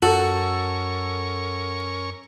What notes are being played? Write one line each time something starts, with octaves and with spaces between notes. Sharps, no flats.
F#2 C#4 F#4 A4 A#4 C#6